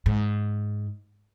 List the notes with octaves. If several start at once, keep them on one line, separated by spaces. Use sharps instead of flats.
G#2